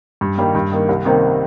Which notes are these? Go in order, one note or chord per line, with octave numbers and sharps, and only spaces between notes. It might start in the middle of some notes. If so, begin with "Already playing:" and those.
G2
D#3 G3 A#3
G2
D#3 A#3
C2
C3 D#3 G3 A#3